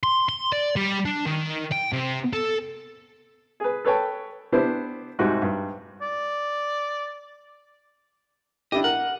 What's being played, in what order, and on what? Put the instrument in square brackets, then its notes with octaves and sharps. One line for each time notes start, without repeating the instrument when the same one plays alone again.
[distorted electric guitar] C6
C6
D5
G3
D4
D#3
G5
C3
A4
[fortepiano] G#4 B4
A4 B4 C#5 G5 A5
B3 D4 E4 G4 B4 C5
C2 G#2 D#4 F#4 G4 F#6
G2
[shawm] D5
[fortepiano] D4 E4 G4 [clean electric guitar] D#5
[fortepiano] A#4 [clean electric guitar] F#5